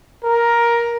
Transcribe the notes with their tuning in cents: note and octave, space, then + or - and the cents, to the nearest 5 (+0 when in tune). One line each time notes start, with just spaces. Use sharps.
A#4 +10